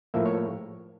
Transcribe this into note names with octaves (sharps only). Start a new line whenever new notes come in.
A2 F3 A#3 E5
C#5